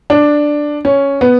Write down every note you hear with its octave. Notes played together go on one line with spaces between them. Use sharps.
D4
C#4
B3